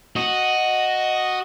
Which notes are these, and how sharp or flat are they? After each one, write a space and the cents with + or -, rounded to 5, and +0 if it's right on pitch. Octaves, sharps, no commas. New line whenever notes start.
F#4 +0 D#5 +0